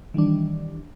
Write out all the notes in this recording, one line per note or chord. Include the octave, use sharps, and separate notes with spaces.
D#3 E3 G3 D4